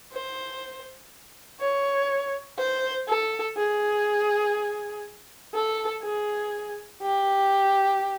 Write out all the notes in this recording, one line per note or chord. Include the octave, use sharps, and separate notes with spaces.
C5
C#5
C5
A4
G#4
A4
G#4
G4